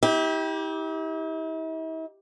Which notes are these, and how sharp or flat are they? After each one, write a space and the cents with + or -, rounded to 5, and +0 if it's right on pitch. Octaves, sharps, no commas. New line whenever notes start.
E4 -45 G4 +0